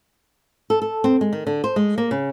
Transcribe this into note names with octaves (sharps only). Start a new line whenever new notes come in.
A4
A4
C4
G#3
D#3
D3
C5
G#3
A#3
C#3